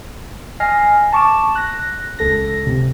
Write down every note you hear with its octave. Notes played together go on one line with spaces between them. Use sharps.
D#5 G#5 F6 A#6 C7
A5 C#6 D6 E7
F#6 A#6
C#2 A4 A#6
C3